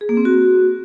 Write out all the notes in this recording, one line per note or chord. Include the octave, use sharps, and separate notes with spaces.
G#4
A#3
C4
F#4